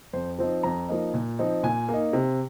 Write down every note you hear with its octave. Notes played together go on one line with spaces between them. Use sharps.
F2 C5
F3 C4 D#4
F2 A#5
F3 A#3 D#4
A#2
F3 C4 D#4
A#2 G#5
A#3
D#4
C3